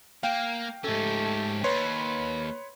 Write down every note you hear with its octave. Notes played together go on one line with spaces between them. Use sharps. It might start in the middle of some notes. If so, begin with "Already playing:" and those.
A#3 F5 G5
G#2 A3 C#4 G4 A4
D#2 B4 C#5 B5 C6